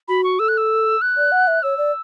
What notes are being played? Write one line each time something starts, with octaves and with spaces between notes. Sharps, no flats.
F#4 B5
C#6
A4 E6
F#6
E6
F#6
D5
F#5
E5
C#5 E6
D5